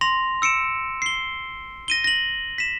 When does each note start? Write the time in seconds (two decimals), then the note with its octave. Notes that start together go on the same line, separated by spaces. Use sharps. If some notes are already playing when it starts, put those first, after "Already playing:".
0.01 C6 A#6 F7
0.42 E6 C#7 D7 E7
1.02 C7 G7
1.88 A#6 D#7 G7
2.04 A#6 F#7
2.58 B6 E7